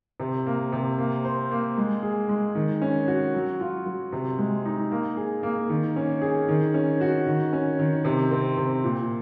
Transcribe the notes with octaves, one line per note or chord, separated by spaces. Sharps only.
C3
A#3
C3
A#3
C5
A#3
G#3
G#4
G#3
D#3
C#4
F#4
F#3
F4
F#3
C3
G#3
D#4
A#3
G#4
A#3
D#3
C#4
G#4
D#3
C#4
F#4
D#3
C#4
D#3
C3
C4
C3
A#2